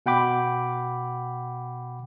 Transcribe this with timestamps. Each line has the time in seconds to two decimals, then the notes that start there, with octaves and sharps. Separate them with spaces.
0.06 B2 F#5 G5 B5 D6